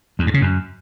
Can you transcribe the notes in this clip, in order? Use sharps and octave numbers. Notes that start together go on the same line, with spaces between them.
E2
G2
C#3
F#2